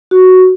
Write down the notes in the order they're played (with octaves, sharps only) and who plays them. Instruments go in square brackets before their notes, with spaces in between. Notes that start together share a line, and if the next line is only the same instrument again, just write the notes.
[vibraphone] F#4